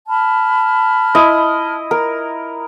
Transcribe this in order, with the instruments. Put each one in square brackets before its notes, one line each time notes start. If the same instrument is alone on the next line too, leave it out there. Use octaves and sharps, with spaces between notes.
[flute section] A5 B5 F6
[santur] E4 D#5
A#4